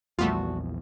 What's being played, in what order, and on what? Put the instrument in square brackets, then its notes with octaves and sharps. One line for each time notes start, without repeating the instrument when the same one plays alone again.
[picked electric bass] A#1 E2 [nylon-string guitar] G3 F#4 A5 [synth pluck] A3 B3 F4